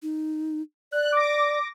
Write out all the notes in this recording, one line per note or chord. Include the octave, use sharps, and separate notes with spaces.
D#4
D5 F#6
D6 A#6